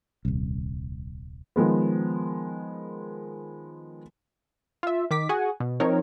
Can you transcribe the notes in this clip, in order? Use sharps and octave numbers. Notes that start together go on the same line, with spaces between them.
D#1 C2
D#3 F3 G#3 B3
F4 E5
D#3 D6 B6
F#4 G#4 F#5 G#5
B2
F3 C4 D#4 A#4 C#5